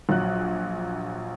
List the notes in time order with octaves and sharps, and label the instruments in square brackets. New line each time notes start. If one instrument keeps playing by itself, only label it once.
[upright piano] A#1 F#3 F#6